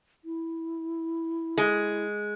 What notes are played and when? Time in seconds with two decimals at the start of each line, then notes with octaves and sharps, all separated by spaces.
0.25 E4
1.58 G#3